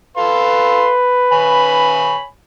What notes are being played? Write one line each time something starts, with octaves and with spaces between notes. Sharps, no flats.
A4 B4 F5 C6
C#5 G#5 B5